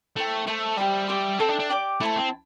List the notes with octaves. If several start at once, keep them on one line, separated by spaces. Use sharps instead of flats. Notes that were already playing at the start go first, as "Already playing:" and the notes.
A3 E4 C5 G5
A3 C5 E5 A5
G3 G4 C5 E5
G4 E5 C6
C4 A4 E5 G5
D4
D4
G4 D5 G5 D6
A3 E4 C5 A5
C4